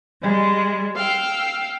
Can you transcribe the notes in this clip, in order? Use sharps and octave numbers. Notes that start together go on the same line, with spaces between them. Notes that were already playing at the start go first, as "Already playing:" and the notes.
G3 G#3
F5 G5 E6